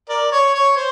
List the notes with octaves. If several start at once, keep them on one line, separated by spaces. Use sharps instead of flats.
A#4 D5
C#5
C#5
C5